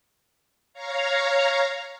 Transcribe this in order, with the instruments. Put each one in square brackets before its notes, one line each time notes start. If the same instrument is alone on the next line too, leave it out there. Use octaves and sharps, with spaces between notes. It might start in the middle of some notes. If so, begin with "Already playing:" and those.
[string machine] C#5 F5 A#5